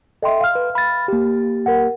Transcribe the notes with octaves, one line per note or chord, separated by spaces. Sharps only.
A4 D#5 E5 G5 C6
F5 F6
B4
B5 A6
A#3 G4
A#4 F#5